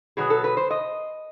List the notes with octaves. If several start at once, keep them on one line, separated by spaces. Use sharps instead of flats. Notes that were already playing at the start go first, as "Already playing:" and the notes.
B2 F#3 B3 G#4
A4
B4
C5
D#5